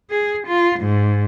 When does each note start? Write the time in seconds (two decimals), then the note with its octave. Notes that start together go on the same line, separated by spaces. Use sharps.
0.10 G#4
0.47 F4
0.80 G#2